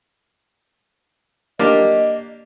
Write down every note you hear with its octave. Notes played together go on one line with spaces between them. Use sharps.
A#3 D4 G4 D#5